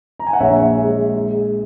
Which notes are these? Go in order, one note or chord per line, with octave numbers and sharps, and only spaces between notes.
A#5
G#5
F#5
A#1 C#5 E5
G#3
G#3